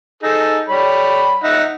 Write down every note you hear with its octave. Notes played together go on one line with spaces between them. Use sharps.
D#4 G#4 A4
G3 C#5 B5
D#4 E5 F#5